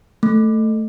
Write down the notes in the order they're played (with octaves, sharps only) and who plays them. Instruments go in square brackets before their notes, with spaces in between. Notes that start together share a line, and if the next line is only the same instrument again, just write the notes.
[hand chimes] A3